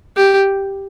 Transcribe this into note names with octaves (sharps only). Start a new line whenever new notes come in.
G4